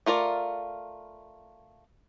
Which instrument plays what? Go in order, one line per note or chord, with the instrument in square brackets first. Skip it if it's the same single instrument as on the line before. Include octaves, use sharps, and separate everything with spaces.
[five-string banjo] A3 F4 A#4 D5